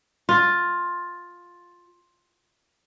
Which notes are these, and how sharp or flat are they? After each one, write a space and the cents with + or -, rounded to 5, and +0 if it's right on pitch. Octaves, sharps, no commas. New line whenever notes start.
F4 +10